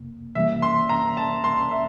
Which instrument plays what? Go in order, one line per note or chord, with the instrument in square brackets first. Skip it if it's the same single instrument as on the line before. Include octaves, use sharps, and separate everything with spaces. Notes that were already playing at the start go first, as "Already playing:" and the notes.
Already playing: [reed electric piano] F2 C3 A#3
[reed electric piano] C3 E3 G3 A#3 [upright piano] E5
[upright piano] C6
A#5
A5
C6
E5